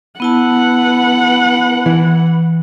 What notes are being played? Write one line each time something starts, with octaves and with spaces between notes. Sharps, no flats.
B3 E4 B4 F#5 A5
E3